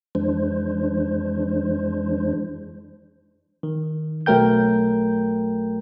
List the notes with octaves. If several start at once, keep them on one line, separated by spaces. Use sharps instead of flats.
F2 E3 G#3 D4 C5
D#3
B1 F#3 A3 A#4 G5 G6